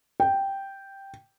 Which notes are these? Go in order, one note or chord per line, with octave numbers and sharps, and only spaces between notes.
G5